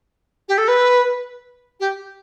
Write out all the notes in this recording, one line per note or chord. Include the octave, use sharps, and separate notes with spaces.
G4
A4
B4
G4